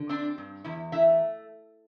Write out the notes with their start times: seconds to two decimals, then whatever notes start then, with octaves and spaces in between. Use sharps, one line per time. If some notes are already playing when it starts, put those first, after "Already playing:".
Already playing: D3
0.09 C4 D4 D5
0.38 G2
0.64 E2 E4
0.92 A3 E4 E5